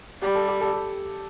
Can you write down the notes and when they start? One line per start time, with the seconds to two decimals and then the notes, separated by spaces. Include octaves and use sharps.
0.22 G3 G4
0.35 A4
0.48 G4
0.61 A4
0.73 G4